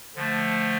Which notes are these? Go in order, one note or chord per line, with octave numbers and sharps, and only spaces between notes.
D3 F3 A3